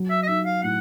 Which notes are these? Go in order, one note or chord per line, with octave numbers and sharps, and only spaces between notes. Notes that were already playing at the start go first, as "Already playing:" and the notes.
Already playing: F#3
E5
D#5
D#4 E5
F5
A2 F#5